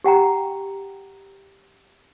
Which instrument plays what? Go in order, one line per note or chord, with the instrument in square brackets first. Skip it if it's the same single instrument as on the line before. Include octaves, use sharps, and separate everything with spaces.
[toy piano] G4 F#5 G5 A#5